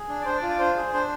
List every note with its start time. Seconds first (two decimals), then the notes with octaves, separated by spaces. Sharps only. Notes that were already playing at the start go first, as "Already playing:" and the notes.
Already playing: G#4
0.09 D4
0.21 D5
0.25 D4 C5
0.37 D5
0.42 F4
0.48 D5
0.59 D4 C5
0.76 G#4
0.93 D4 C5